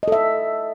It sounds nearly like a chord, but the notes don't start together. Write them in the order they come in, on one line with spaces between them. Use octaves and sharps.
D#5 A4 E5